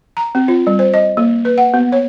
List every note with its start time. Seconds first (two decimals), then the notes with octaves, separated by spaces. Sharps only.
0.17 A#5
0.35 C4
0.48 F4
0.67 G3
0.79 C5
0.94 D#5
1.17 A#3
1.45 B4
1.58 F#5
1.74 B3
1.92 C#5